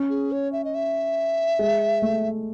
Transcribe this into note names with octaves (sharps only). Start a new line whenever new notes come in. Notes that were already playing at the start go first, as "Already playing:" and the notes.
Already playing: C#4
G#4
C#5
E5
D#5
E5
G#3
A3